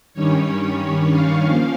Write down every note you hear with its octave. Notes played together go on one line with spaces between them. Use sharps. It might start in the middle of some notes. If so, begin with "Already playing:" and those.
G2 D#3 G3 C#4 C#5
F5
F3 A#3 C#4 F5